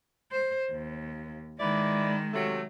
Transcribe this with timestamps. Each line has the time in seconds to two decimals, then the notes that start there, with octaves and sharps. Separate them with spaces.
0.32 C5
0.71 D#2
1.60 D#3 G#3 E4 B4 D5
2.33 C3 F#3 A3